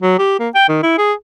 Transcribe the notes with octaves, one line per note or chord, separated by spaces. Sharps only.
F#3
G4
A#3
G5
D#3
E4
G#4